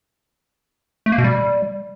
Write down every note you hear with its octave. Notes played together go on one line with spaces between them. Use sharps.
A3
A#3
B2
G3